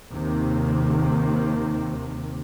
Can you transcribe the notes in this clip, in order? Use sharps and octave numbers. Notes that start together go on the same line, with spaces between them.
D#2 C3 D#3